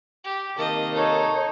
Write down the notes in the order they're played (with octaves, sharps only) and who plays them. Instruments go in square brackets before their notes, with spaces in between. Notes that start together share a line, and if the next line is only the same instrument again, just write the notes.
[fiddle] G4
[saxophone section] C3 D#3 A#3 [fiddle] D#5 A5
[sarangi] D#4 [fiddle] A4 [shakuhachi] C#5